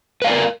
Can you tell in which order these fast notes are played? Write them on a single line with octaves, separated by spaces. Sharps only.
B4 F5 D5 A#4